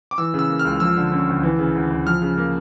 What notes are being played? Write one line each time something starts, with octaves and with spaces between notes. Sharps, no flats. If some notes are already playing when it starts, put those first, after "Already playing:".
D6
E3 E6
C#3
E6
A#3
F6
C#2
F3 E6
D3
C#4
D2
E3
C#3
D2
D2
F3 F6
C#3
A#3